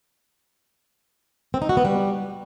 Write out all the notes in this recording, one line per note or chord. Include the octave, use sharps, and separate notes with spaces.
C4
D#4
F#4
B3
G3